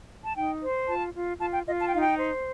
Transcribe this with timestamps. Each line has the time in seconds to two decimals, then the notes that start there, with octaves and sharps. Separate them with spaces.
0.24 A5
0.34 D#4 G5
0.61 C5
0.87 F4 A5
1.14 F4
1.39 F4 A5
1.53 G5
1.66 F4 D#5
1.79 A5
1.87 G5
1.93 D#4 F5
2.02 G5
2.19 C5